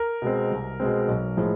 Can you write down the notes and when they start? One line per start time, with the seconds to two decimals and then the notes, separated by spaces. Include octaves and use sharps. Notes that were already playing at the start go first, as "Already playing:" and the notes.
Already playing: A#4
0.22 B2 G#3 C4
0.51 C2
0.80 B2 G#3 C4
1.08 B1
1.37 A2 F3 G#3